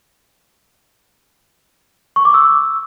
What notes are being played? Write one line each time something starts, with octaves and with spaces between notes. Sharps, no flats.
C#6
D6
E6